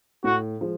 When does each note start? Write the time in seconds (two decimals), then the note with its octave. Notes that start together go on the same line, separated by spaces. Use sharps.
0.24 A2 F#4
0.61 F3 G#3